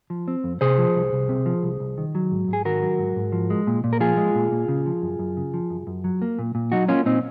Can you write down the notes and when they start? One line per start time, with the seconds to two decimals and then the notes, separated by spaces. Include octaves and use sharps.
0.10 F3
0.28 C4
0.44 F2
0.61 C3 G#4 C5
0.78 F3
0.95 C2
1.13 C2
1.29 C3
1.46 F3
1.63 C2
1.80 C2
1.98 D#3
2.15 F#3
2.31 G#2
2.48 G#2
2.53 G#4
2.65 D#3 F#4 A#4
2.83 F#3
2.98 G#2
3.16 G#2
3.32 F3
3.50 G#3
3.67 A#2
3.84 A#2
3.93 A#4
4.00 F3 F4 G#4
4.17 G#3
4.35 A#2
4.52 A#2
4.68 C#3
4.86 F3
5.02 F#2
5.19 F#2
5.37 C#3
5.54 F3
5.70 F#2
5.87 F#2
6.04 F#3
6.22 A#3
6.39 A#2
6.55 A#2
6.72 F#3 D#4 F#4
6.89 A#3 C#4 F4
7.06 A#2 C4 D#4